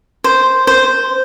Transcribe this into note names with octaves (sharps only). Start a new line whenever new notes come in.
C5
C5